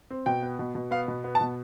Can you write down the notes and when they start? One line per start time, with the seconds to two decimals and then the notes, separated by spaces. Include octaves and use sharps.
0.10 C4
0.26 B2 G5
0.43 B3
0.59 B2
0.75 B2
0.91 B3 F5
1.08 B2
1.24 B3
1.35 A5
1.41 B2